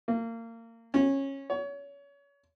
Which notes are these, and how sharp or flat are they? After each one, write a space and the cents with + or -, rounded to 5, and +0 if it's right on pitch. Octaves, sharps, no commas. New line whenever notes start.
A#3 -30
C#4 -20
C#5 +30